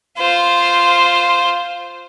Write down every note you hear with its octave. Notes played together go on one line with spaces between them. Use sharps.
F4 C5